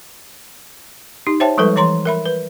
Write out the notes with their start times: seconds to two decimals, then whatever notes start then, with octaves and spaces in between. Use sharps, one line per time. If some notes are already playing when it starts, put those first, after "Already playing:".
1.27 D#4 G4
1.40 C5 C#5 E5 G5 A5
1.58 F3 G3 G#3 A4 B4
1.76 E3 C#5 A#5 C6
2.05 A#4 E5 B5
2.26 B4